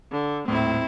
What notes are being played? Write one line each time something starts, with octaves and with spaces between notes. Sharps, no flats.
D3
D#1 A2 C4 E4